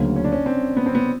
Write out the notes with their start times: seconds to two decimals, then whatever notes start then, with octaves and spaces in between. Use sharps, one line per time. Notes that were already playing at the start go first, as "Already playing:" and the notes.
Already playing: D2 C#3 F#3 A#3
0.16 C#4
0.24 D4
0.32 C#4
0.46 C4
0.77 B3
0.86 C4
0.95 B3